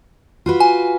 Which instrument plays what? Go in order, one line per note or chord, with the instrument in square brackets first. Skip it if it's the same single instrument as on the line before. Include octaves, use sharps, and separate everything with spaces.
[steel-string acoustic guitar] F4 F#4 B4
[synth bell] G#5